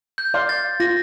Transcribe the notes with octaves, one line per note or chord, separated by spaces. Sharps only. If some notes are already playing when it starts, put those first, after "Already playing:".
G6
D5 F5 C6
A6
F4 A#6